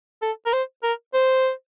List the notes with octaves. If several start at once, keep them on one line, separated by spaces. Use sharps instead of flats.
A4
A#4
C5
A#4
C5